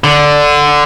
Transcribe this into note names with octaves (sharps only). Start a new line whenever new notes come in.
D3